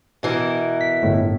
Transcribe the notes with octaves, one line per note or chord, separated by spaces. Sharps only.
B2 E3 A#4
B6
G1 A2